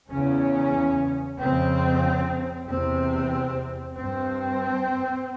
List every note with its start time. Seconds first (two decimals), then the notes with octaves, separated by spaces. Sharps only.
0.11 E2 C#3 C#4
1.39 F2 C#3 C4
2.68 E2 C3 C4
3.97 G2 C4